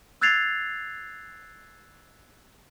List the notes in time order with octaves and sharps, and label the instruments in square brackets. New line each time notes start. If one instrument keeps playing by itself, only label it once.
[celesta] E6 F#6 G#6 A6 C7 F7